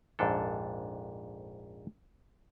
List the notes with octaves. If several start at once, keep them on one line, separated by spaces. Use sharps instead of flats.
A#1 F2 G#2 D4 A4